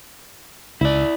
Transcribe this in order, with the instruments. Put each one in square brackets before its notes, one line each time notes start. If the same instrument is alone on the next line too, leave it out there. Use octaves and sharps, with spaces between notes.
[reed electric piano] C#2 [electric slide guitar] E4 D5